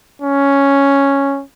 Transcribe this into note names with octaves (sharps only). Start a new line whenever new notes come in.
C#4